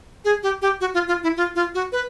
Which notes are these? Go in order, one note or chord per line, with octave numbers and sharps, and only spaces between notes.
G#4
G4
G4
F#4
F4
F4
E4
F4
F4
F#4
B4